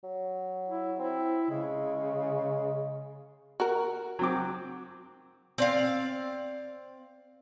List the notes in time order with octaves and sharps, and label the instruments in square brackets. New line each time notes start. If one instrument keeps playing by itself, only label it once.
[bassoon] F#3
[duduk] E4
[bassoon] C4 [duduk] E4
[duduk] C#3 [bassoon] G#3
[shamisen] F#4 A#4
[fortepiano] F#3 C4 D6
[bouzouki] C4 D5 F5